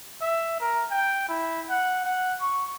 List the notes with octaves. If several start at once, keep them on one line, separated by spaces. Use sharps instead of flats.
E5
A#4
G5
E4
F#5
F#5
C#6